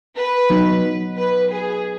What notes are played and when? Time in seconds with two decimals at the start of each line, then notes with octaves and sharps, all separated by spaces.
0.17 B4
0.50 F#3 B3 D#4
1.17 B4
1.51 G#4